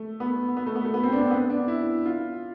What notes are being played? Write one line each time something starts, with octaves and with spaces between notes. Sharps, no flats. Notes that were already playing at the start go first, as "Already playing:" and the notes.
Already playing: A3
B3
B3
A3
B3
A3
B3
C4
D4
C4
B3
D4
E4
F4